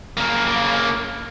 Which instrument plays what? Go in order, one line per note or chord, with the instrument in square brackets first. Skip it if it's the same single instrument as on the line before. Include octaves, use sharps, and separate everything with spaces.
[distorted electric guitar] C#3 A#3